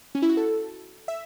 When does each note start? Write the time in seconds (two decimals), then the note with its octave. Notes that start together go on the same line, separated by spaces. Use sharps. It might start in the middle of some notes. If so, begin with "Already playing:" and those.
0.15 C#4
0.22 E4
0.29 F#4
0.37 A4
1.08 E5